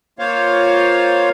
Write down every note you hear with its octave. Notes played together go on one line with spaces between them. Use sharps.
A#3 F4 C5 C#5 F5